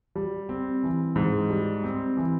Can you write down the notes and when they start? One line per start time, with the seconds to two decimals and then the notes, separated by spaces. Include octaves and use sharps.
0.15 G3
0.49 C4
0.83 E3
1.16 G#2
1.50 G3
1.84 C4
2.17 E3